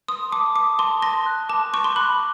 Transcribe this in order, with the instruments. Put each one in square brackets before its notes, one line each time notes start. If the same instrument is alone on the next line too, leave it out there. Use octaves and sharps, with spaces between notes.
[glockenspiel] C6 [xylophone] D#6
[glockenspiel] A5 [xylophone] D6
[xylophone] D6 [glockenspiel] D#6
[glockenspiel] A5 [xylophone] C6
[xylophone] C6 [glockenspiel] A#6
[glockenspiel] F#6
[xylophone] A5 [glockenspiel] D6
[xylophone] C#6 [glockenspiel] D6
[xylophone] C6
[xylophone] B5 [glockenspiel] F#6